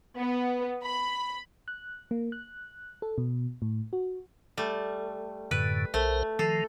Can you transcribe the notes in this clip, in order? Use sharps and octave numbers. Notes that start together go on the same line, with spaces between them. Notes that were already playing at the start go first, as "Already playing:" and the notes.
B3
B5
F#6
A#3
F#6
A4
B2
A2
F#4
G3 A3
F#2 A2 D3 B4
B1 A3 A#4 C5
D#3 F3 A4